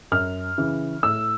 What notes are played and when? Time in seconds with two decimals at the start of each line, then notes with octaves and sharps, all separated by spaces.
0.12 F#2 F6
0.58 C#3 E3
1.03 A2 E6